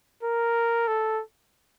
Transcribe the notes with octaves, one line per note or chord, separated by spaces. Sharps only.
A#4
A4